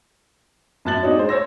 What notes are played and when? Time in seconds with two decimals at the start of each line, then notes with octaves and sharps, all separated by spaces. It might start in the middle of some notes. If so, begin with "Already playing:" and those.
0.85 F#2 A2 A5 F#6 A6 F#7
1.03 C4 D4 D#4 F#4 C#5
1.17 G#3 C5
1.29 C5 C#5 E6 A#6